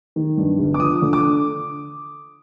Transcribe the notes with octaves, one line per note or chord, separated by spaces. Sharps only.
D#3
G2
G1
D6
F3 D#6
D3
D6